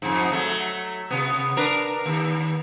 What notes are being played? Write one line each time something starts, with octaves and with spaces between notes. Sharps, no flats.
F2 G#2
F#3 A3
C3 B3
D4 A#4 B4
D#2